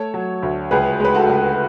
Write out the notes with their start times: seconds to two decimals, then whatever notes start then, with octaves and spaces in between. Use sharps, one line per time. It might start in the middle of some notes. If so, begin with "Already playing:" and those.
Already playing: A3 A4 C#5
0.14 F#3
0.43 D2
0.71 C#2 G#4 B4
1.00 G#3 B4
1.15 F#4 A4
1.29 C#2